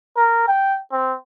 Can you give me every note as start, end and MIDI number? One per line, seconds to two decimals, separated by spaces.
0.16 0.46 70
0.47 0.76 79
0.92 1.14 60